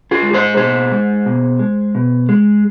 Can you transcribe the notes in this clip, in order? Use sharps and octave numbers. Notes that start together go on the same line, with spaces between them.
F4 G#4
G#3
G#4 C5
B2 G#4 C5
G#3
B2
G#3
B2
G#3